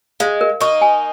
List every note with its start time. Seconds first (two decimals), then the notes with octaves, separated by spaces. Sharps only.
0.20 G#3 F5
0.41 A#4
0.61 A#3 D#4 C#6
0.81 G#5